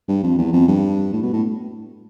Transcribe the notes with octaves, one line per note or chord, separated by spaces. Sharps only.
G2
F2
E2
F2
G2
A2
B2
A2